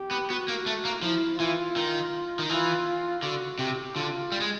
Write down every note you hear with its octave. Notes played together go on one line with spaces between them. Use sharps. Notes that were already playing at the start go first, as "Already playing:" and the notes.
Already playing: G4
B3
B3 F#4
A#3
A3
A#3
F3 E4
E3 F4
D#3
D#3
E3 F4
D3 F#4
C3 G4
D3 F4
G3
G#3